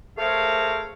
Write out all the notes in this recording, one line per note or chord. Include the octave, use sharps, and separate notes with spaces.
A3 G#4 A#4 C5 C#5 F5